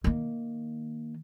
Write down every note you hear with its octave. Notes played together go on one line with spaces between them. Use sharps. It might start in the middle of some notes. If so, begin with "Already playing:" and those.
D#3 A#3